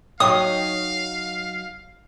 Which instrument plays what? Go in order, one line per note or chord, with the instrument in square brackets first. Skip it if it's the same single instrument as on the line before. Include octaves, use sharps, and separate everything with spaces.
[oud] F#3 D#4 C#5 [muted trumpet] F5 [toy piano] G5 [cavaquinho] D#6